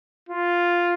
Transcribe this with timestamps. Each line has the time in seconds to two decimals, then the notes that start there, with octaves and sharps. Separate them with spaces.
0.29 F4